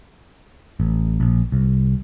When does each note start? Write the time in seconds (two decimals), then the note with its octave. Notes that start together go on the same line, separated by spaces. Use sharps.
0.80 A1
1.20 A#1
1.52 C2